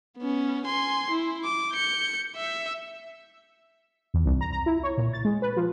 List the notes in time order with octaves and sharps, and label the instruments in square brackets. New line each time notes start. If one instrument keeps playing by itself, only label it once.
[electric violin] B3 C#4
G#5 C6
E4
D6
G6 C#7
E5
[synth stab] E2
C2
A#5
A#5
E4
C#5
A#2
A6
G#3
B4
F3